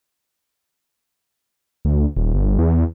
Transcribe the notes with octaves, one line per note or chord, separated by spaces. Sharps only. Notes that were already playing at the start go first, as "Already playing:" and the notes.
D2
D#1
G1
E2